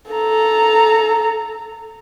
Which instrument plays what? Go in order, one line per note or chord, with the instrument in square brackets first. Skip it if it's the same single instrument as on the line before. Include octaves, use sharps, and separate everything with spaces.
[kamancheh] A4 A#5